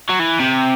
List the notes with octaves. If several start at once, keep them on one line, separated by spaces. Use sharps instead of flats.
F#3
E3
C3